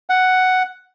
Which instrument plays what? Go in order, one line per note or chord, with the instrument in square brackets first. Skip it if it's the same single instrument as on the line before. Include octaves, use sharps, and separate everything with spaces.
[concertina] F#5